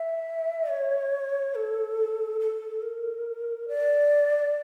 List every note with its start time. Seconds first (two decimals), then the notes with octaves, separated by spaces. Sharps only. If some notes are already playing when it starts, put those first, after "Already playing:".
Already playing: E5
0.70 C#5
1.55 A4
2.40 A4
2.82 A#4
3.68 D5